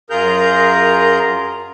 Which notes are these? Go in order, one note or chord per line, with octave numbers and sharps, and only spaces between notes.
F#2 F4 G#4 A#4 A#5 G6